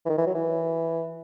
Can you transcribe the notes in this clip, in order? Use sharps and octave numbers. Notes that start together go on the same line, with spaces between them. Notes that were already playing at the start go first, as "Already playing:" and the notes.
E3
D#3
E3
F#3
E3